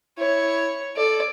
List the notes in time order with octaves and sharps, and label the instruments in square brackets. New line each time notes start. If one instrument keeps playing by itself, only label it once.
[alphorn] E4 [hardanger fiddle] C#5
[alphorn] A4 [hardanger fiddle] D5